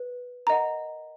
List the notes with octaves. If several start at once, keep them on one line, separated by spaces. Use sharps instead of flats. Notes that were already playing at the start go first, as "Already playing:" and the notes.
Already playing: B4
A#4 D#5 F#5 A#5